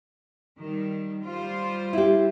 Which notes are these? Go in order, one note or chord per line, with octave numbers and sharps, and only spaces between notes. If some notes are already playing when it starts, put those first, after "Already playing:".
D#3 G3
G3 F4 C5
E4 G4